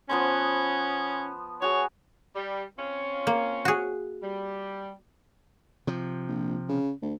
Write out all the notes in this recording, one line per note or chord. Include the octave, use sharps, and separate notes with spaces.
F3 B3 C#4 C6
F#4 G#4 C#5
G3
C4 C#4 F4
A#3
F#4 G#4
G3
C3 F3
A#1
C#3
D2